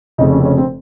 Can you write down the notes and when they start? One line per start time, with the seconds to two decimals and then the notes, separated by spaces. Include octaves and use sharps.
0.18 F1 F2 C#3 D#4
0.31 C#4
0.40 C4
0.45 C#4
0.58 C4